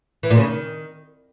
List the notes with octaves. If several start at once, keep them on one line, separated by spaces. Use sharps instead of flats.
E3
A#2
C#3
D#3